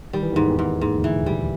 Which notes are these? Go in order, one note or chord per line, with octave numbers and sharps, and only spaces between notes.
D#3 G3
E3
D#2 G#2 D#3
E2 E3
G#2
D#2 G#2 D#3
D2 D3
E3
A#1 A#2
G3